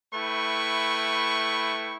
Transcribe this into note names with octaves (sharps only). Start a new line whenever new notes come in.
A3 E4 B4 G5 C#6